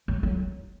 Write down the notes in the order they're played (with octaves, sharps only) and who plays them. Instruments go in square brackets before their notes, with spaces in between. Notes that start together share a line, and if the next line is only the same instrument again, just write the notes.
[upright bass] F#3
F#3